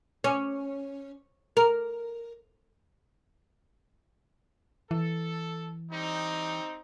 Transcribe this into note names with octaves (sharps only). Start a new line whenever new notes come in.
C#4
A#4
E3 A4
G3 C4 D#4